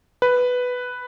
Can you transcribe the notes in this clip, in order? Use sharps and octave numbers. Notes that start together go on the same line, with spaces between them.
B4